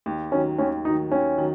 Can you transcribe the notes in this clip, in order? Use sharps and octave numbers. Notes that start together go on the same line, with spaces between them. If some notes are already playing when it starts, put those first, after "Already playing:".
D#2
D#3 F#3 C#4
D#2 C#4
F#3 D#4
D#3
D#2 C#4
D#3 F#3